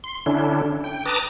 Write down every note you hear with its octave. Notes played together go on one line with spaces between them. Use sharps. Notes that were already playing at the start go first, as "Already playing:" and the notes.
C6
D3 C#4 D4 E4
G5
B4 A5 A#5 D6 D#6